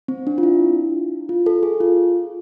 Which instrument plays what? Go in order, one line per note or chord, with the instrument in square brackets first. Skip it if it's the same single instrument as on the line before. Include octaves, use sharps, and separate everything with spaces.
[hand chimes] C4
D4
F4
E4
F4
A4
G#4
F4